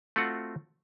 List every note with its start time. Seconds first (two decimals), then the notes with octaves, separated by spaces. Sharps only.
0.16 A3 C4 F4 F#4 F#5